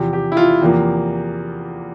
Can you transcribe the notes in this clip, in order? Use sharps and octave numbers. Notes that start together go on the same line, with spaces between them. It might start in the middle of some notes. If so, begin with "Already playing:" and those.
Already playing: E2 C3 F3
G4
E4
F4
E2 C3 F3 A#3